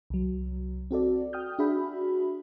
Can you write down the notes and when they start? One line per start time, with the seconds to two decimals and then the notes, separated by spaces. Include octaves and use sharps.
0.10 C2 F#3
0.91 C4 F#4 A4 D5
1.33 G5 D#6 F6 G6
1.59 D4 F#4 G#4 E5 B5